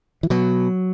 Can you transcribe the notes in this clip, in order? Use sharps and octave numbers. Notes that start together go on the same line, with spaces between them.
E3
B2 F#3